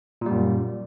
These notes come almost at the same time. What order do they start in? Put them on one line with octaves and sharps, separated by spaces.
A#2 G3 F#2